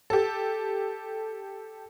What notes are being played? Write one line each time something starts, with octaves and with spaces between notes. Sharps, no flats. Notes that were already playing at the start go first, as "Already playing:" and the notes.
G4 A4